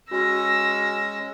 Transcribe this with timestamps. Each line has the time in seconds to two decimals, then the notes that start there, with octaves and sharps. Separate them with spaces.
0.11 G#3 C#4 F#4 E6 A#6